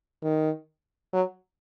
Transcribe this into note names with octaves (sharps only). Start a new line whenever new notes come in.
D#3
F#3